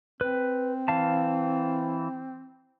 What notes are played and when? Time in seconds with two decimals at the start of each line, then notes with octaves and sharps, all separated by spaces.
0.21 C4 B4
0.88 E3 F5 A5